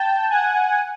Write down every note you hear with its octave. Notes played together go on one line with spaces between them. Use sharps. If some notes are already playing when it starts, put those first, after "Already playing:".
Already playing: G5 A5
F#5 G#5